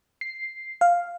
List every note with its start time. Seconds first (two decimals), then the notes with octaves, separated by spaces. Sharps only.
0.21 C7
0.81 F5